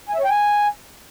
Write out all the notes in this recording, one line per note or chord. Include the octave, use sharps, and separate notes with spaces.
G#5
E5
C#5
G5
G#5